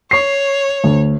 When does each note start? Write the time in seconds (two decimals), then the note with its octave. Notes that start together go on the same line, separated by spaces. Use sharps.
0.11 C#5 C#6 C7
0.84 D2